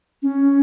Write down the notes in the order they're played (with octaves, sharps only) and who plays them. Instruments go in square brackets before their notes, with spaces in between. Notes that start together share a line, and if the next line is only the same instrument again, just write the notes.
[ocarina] C#4